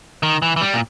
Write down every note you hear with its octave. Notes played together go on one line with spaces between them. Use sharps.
D#3
E3
E3
G3
A#2